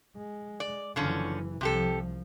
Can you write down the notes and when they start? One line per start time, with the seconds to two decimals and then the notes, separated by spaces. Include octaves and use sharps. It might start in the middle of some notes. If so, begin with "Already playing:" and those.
0.17 G#3
0.60 D5
0.96 F#1 D3 E3 F3 C#4
1.61 C2 C3 F3 G4 A4